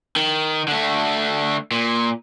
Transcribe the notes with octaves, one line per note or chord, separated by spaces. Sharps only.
D#3
D3 A3
A#2